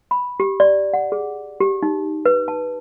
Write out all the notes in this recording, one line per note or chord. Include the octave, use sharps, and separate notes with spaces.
B5
G4
D5
F#5
G#4
G4
D#4
B4
A5